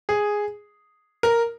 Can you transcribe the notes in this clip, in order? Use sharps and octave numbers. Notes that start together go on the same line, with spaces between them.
G#4
A#4